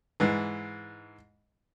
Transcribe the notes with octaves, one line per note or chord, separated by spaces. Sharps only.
G#2 E3